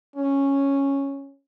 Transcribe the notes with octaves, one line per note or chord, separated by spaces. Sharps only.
C#4